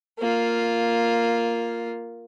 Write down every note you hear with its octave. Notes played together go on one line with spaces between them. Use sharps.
A#3 F4